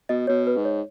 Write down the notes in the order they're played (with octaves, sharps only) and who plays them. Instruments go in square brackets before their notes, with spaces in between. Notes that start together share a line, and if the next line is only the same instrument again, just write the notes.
[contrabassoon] B2 [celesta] D#5
[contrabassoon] B2 [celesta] C#5
[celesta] B4
[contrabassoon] G#2
[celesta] C#5